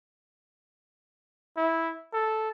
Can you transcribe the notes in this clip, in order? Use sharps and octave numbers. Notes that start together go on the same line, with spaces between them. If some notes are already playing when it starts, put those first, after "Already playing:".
E4
A4